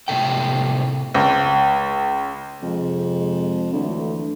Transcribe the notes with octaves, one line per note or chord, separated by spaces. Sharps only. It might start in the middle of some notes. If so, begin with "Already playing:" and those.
A2 C3 A4 G5
C#2
F2 C3 G#3
D2 E3 F#3 A3